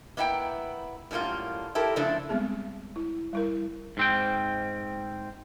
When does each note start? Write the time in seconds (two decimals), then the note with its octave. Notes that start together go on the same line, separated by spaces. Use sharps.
0.17 A#3 B3 E4 F5 G5 A#5
1.11 F#2 A2 G3 A#3 F4
1.75 E4 G4 A4 A#4
1.96 C#3 F3 A3 D4 E4 A4
2.29 G3 G#3 B3 C4 G#4
2.96 E4
3.33 G3 E4 A#4
3.97 G#2 C4 G5